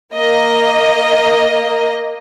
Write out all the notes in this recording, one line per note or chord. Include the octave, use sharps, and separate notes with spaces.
A#3 D#5